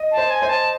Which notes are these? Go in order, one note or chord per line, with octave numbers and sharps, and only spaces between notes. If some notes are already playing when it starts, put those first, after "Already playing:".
Already playing: D#5
A5
C5
G#5
C5
A5